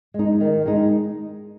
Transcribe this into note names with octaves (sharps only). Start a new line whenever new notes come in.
G#3 D#4
D#3
G#3 D#4